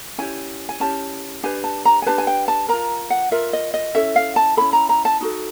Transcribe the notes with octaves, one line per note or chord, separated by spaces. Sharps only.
C#4 E4 G4 G#5
G#5
C#4 E4 G4 A5
D4 G4 B4 G#5
A5
A#5
G#5
D4 G4 B4 A5
G#5
G5
A5
F4 A#4 A#5
F#5
F4 A#4 E5
D#5
D#5
C#4 E4 A4 E5
F5
A5
C#4 E4 A4 B5
A#5
A#5
A5
D#4 F#4 A4